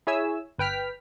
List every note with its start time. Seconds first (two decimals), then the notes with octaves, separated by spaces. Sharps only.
0.07 E4 G#4 C#5 E5 G#5 E6
0.58 G1 B4 G5 F6 B6